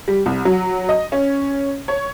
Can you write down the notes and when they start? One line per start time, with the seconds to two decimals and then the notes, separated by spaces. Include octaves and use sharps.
0.08 G3
0.26 C2
0.45 F#3
0.89 D#5
1.12 C#4
1.88 C#5